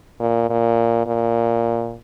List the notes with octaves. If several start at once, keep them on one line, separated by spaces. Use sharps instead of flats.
A#2
A#2
A#2